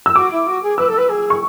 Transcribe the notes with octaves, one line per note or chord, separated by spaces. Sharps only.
E6
F#4 D6
E4
F#4
G#4
B4 E6
A4
B4
G#4
C#6